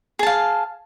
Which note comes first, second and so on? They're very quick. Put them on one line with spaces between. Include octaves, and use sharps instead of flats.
G#4 A5 F5